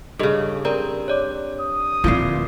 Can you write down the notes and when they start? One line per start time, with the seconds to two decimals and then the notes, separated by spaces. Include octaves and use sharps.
0.19 G2 C#3 A4 D#5
0.65 C4 A#4 D5 A#5
1.08 C#5 D5 D6
1.61 D#6
2.04 D1 A#2 E3 F3 C4 F4 F5 C7